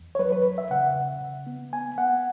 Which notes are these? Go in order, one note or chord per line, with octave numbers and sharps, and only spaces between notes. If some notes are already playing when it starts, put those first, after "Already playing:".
Already playing: E2
C#5
F#3 B4
B4
E2
E5
C#3 F#5
C#3
C#3
B3
B3 G#5
B3 F#5